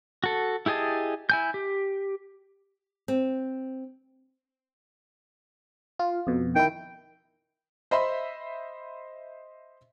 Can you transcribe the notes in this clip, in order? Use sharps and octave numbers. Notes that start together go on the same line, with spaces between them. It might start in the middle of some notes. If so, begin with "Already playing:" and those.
F#4 A4
E4 G4 G#4 D#5 A5
E4 G#5 G6
G4
C4
F4
F2 B2
D#3 E4 G5
C5 D#5 E5 B5 C6